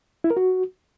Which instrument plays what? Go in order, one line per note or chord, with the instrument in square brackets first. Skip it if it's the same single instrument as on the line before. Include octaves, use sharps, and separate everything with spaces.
[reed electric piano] E4
A#4
F#4